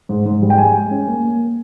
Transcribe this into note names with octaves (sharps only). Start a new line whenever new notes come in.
G#2
G#2
G3
G5
G#3 G#5
G#3
C#4
A#3
A#3